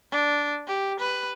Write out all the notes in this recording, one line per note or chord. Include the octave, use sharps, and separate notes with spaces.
D4
G4
B4